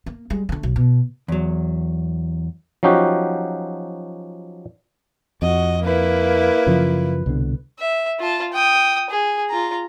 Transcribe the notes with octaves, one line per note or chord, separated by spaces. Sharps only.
A#3
G3 G#3
D3 A3
B1
B2
E2 F#3
F3 F#3 C#4 D#4 F#4 G4
F2 F#4 D#5
A#3 E4 B4
F#2 C#3 F3
C2 B2 D3
E5
F4 A5
G5 D#6
G#4
F4 A#5